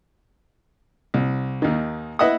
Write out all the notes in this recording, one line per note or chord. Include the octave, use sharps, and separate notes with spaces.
C2
D#2 D#3
E4 B4 D#5 E5 F#5 D#6